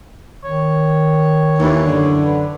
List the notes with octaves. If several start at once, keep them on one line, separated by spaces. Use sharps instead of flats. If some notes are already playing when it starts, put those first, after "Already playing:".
D#3 C#5
D#2 E3
F#2 D3
B4